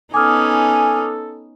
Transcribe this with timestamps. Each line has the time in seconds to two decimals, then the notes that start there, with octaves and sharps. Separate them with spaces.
0.14 B3 C#4 D#4 A4 G#5 D6 D#6 F6